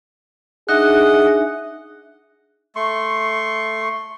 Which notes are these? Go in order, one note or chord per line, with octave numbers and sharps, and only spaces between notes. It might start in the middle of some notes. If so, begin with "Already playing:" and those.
D4 D#4 G#4 D#5 E5 F#5 F#6
A3 C6 C#6